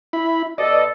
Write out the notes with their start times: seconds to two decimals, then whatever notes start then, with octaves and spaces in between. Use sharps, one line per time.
0.13 E4 B5
0.58 B2 A4 D5 D#5